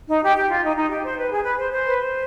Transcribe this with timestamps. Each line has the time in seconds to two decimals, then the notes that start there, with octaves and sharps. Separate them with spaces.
0.09 D#4
0.24 G4
0.36 G4
0.50 F4
0.64 D#4
0.76 D#4
0.90 G4
1.03 C5
1.17 B4
1.30 G#4
1.44 B4
1.57 C5
1.71 C5
1.85 B4
1.98 C5